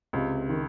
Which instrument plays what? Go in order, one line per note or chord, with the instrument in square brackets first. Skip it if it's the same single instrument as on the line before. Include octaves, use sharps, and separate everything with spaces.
[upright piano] C#2 [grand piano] C3
[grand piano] D#3